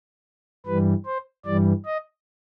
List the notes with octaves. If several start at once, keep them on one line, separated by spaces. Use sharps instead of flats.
G2 E3 G3 B4
C5
G2 E3 G3 D5
D#5